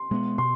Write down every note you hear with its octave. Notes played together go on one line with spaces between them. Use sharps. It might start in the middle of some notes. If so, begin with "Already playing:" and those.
Already playing: C6
B2 G#3 B3
B2 C6